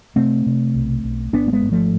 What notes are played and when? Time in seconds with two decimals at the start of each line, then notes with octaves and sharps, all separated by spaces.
0.16 C3 A3 C4
0.46 C3
0.74 B1
1.04 B1
1.33 G#1 B3 D4
1.48 A3
1.53 G#3 B3
1.62 G#2
1.72 F3 A3